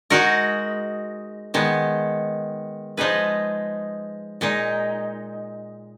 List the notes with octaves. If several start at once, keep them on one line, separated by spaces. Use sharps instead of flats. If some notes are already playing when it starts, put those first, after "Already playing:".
G#3 D#4 F#4 A#4
D#3 G#3 B3
F3 G#3 D#4 G#4 B4
A#2 G#3 D#4